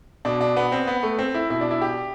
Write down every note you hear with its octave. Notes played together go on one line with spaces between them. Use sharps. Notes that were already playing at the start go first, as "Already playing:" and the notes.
B2 D4
D4
B3
C4
B3
A3
C4
E4
B2 E4
D4
E4
G4